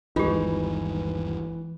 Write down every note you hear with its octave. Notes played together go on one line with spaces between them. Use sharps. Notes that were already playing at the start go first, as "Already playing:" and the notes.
G1 D#2 E3 G#3 D#4 F4 G4